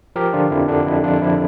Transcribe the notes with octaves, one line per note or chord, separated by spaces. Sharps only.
F3 G4 A#4
D3 D4 F4
F2 E4
D3 D4
F2 E4
F2 D4 F4
F3 E4